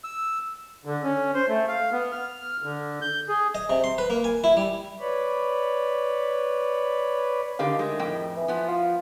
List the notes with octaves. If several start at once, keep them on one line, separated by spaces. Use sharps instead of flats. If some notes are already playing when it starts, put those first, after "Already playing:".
E6
D3
C#4
C5
A3
F5
B3
F6
D3
G6
G#4
D#5
C3
C6
B4
A#3
G#5
E4
G3
B4 C#5 D5 B5
D3 D#3 G4 F5
G#3 A3
F2 A2 G5
E3
F3 B3
F4